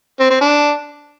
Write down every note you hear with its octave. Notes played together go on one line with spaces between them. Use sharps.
C4
C4
D4